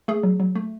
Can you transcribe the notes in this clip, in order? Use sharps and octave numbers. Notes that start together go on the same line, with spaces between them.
A3 G#4
F#3
F#3
A3